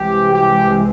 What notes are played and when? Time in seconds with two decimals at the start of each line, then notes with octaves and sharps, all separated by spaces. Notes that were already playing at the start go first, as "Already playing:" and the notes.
Already playing: C2 C3 E3 G#3 G4
0.33 G4